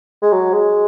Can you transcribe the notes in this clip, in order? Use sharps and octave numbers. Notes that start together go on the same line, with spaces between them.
G#3
F#3
G#3